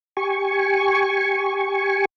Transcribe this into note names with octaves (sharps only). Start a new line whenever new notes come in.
G4 G#5 C#6